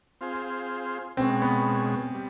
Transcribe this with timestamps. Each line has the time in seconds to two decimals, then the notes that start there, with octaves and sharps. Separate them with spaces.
0.21 C4 F4 G#4 C5
1.17 B2 G#3 C4 C#4
1.42 B3
2.14 G3